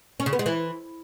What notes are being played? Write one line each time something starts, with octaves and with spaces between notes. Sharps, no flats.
C#4
C#3
B3
G#3
E3